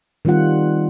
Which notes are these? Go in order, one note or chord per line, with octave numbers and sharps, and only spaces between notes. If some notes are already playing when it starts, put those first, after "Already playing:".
D#3 G3 C4 F4 F#5